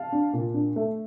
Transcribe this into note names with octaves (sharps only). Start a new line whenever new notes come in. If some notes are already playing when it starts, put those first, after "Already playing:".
Already playing: F5 A5
D4
A#2
D4
A3